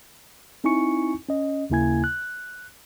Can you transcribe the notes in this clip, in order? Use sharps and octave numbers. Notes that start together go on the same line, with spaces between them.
C4 D#4 E4 G#5 C#6 C#7
C#4 D#5
D#2 C#3 A#3 E4 G#5 G#6
F#6